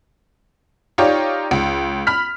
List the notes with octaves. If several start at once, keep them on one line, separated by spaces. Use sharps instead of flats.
D#4 F4 G4 C#5 D5
C#2
B5 F6 B6